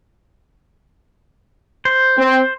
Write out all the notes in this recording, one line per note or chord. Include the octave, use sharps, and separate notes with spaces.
C5
C4